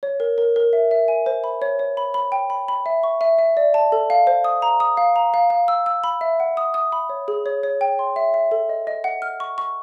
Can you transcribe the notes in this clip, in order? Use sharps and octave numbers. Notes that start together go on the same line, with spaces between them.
C#5
A#4
A#4
A#4
E5
E5
G#5
C5
B5
C#5
C#5
B5
B5
G5
B5
B5
E5
C#6
E5
E5
D5
A5
A4
F5
C5
D#6
A#5
D#6
F5
A#5
F5
F5
E6
E6
B5
E5
F#5
D#6
D#6
B5
C#5
G#4
C#5
C#5
G5
C6
E5
E5
A4
D#5
D#5
F#5
F6
C#6
C#6